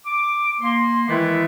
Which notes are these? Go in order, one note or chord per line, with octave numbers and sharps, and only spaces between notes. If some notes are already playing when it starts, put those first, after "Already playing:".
D6
A#3 C6
D#3 E3 G#3 A3 B3 E4